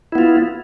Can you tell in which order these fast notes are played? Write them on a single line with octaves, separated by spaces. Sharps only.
E4 B3 F4